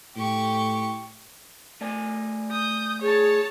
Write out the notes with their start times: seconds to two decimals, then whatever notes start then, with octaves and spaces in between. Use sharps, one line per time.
0.16 A2 G4 C#6
1.81 A3 D5 G#5
2.51 D#6 G6
3.02 G#4 C#5 A5